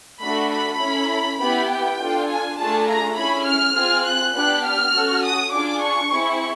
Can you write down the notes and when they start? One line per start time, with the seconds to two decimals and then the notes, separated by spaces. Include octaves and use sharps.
0.21 A3 D4 F#4 A4 B5
0.50 B5
0.80 C#4 E4 A4
1.40 B3 E4 G4 B5
1.69 G5
1.99 D4 F4 A4
2.29 G#5
2.58 A3 D4 F4 G#4 A5
2.87 A#5
3.17 C#4 E4 G#4 B5
3.46 F6
3.75 C4 F4 G#4
4.05 F#6
4.34 B3 D4 G4 F#6
4.64 F6
4.93 C#4 F#4 A4
5.23 D#6
5.52 D4 F4 G#4 D6
5.82 C#6
6.11 C4 E4 G#4